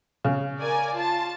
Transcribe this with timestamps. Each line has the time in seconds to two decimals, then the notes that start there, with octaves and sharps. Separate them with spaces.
0.25 C#3
0.59 A#4 D5 G#5
0.94 F4 A5